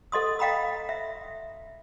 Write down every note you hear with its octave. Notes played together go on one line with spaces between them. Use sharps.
A4 D#5 C6 D#6
D#5 F5 G5 A#5 B5 D#6
E5